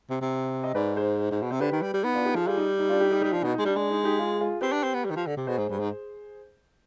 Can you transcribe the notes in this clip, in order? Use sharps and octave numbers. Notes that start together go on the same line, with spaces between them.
C3
C3
D#5
G#2 B4 D5
G#4 C5
G#2
B2
C3 C5
D3 G4 B4
D#3
G3
G3
B3 D#4
D4 F4
D#4 G4
F3 F4 G#4
G3 F4 G#4
D#4
D#4
D4 F4
D#4 G4
D#4 G4
D#4 G4
G3
F3 D4
B2 D#4
D#4
G#3
G3 D4
G#3 D4
D#4
D#4 G4
F4 G#4
F4 G#4
C4 G4 B4
D4
C4
B3
G3
D#3
F3
D3
C3
B2 G#4 C5
G#2
G2
G#2